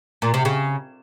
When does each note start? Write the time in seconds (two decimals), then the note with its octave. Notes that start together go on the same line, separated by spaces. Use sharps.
0.22 A#2
0.34 C3
0.45 C#3